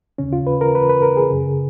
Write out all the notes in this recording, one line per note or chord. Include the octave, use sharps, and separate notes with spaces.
D#2 C#3 C#4
F4
B4
A#4
B4
B4
A#4
G#4
F#2 C#3